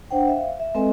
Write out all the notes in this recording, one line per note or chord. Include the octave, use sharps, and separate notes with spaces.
D4 C5 F#5 G5
E5 F5
E5
G#3 C4 A4 B4 D#5 G#5